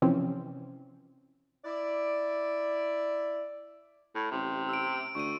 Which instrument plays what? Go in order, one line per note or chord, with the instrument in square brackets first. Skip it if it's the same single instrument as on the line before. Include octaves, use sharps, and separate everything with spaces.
[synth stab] C3 E3 F3 C4 C#4
[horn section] E4 D5
[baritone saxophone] A2
[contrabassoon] A1 [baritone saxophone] C3
[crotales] E6 D7
[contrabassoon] D2 [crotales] C#6 D#7